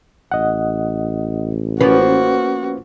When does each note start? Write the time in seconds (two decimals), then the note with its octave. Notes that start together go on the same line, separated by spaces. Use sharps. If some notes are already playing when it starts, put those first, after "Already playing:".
0.32 A1 D#5 F#5
1.81 F3 A#3 B3 C#4 F#4 B4